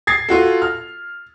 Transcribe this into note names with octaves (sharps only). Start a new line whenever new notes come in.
G#6 A6 C7
F4 F#4 A4
F6